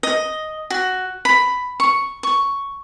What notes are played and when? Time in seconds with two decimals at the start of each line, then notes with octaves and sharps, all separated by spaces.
0.03 D#5
0.70 F#4
1.25 B5
1.80 C#6
2.23 C#6